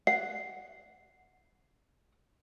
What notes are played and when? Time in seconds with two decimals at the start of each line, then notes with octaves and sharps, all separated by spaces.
0.07 F#5 C7